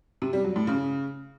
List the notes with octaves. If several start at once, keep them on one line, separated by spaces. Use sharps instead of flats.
C3
G3
F#3
A2
C#3